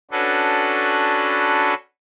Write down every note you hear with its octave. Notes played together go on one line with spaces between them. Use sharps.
C#4 D4 F#4 A4 B4